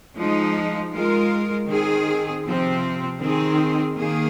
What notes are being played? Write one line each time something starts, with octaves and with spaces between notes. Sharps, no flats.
F3 G#3 D#4
G#3 F4 A#4
D#3 C4 G#4
C3 F3 C4
D#3 C4 G#4
D#3 A#3 G#4